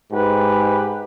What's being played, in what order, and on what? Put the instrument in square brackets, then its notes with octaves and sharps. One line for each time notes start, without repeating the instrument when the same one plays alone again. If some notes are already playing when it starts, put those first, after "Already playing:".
[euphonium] G#2 [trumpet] G4 [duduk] B4